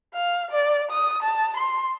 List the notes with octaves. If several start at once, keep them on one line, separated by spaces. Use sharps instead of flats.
F5
D5
D#6
A5
C6